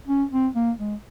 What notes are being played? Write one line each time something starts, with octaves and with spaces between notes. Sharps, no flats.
C#4
C4
A#3
G#3